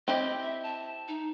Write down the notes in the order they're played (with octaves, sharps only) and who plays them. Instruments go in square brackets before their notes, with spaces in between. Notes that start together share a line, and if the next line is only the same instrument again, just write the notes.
[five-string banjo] C4 E4 G4 [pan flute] D#5
[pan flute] E5
A5
D#4